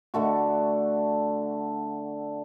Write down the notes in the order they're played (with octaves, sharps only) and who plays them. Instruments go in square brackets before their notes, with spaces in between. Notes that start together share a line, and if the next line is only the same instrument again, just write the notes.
[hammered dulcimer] D3 A3 F#4